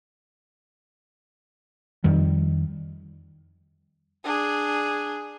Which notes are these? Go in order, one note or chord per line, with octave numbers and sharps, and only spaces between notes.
F2 D#3 G3
D4 G#4